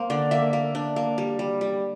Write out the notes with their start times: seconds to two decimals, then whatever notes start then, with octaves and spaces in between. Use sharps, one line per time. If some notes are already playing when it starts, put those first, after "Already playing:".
Already playing: A#3 C5
0.10 D3 D5
0.31 A#3 E5
0.53 A#3
0.75 D4
0.96 A#3
1.18 G3
1.39 G3
1.61 G3